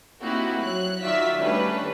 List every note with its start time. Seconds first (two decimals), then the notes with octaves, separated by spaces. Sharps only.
0.22 A#3 C4 D#4 E4 F#4 G4
0.61 F#3 C#5 F#6
1.01 D#3 F4 F#4 D5 E5 B6
1.38 D#3 G3 A3 C#4 D4 B4